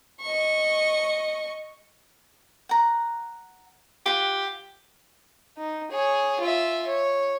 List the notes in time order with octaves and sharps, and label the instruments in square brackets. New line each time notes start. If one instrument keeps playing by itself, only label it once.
[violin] D#5 C#6
[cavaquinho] F#5 A#5
[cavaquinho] F4 F#5 [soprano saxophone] G4
[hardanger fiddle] D#4
G#4 C#5
F4 E5
C#5